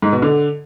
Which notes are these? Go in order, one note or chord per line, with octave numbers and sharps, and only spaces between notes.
G#2
B2
D3